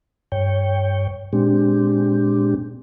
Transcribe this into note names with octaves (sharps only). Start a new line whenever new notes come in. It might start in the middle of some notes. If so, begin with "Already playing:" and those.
G2 C#5 G5
A#2 G#3 C4 D4 G4